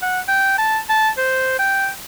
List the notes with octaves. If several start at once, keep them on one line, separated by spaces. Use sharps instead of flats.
F#5
G5
A5
A5
C5
G5